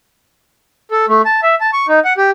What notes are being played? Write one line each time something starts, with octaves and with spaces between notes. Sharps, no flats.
A4
A3
A5
E5
A5
C#6
D#4
F#5
G4